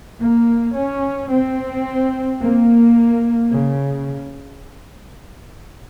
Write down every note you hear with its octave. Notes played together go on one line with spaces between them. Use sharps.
A#3
C#4
C4
A#3
C#3